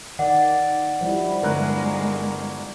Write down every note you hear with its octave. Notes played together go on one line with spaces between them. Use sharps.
D#3 D5 F#5
F3 G3 E4
G1 G#3 A#4 F#6